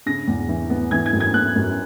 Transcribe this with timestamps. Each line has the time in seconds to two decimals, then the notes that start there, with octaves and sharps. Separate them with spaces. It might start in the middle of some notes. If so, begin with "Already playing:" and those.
0.06 C#3 A#6
0.27 E2
0.49 E3
0.70 B3
0.91 E3 G#6
1.06 G#6
1.13 F#2
1.20 G#6
1.34 B3 F#6
1.56 F#2